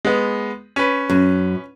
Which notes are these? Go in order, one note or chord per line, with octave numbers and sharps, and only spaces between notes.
G#3 B3
C#4 B4
F#2